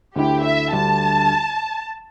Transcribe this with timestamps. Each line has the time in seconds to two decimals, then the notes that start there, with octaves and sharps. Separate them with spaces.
0.16 D2 D3 A3 E4 G4
0.45 E5
0.72 D2 D3 G3 A5